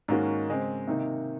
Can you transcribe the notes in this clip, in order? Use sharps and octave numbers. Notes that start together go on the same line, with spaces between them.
G#2 D#3 A#3 C#4 F#4
C#3 G#3 C4
C3 D#3 A#3 D#4